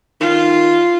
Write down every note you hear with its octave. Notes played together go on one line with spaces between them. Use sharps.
D#3 F4